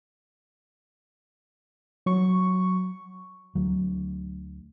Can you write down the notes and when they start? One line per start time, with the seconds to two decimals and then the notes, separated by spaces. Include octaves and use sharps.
2.06 F#3 C#6
3.55 D2 F#3